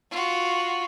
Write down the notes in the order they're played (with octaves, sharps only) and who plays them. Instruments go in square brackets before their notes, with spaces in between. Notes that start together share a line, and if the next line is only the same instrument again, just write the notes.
[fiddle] F4 F#4